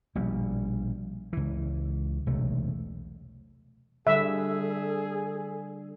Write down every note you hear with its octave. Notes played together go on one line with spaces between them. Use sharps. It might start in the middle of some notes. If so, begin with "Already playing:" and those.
A#1 B2 G3
C#2 E3
E1 B1 C3 A3
D3 G3 G#4 A4 E5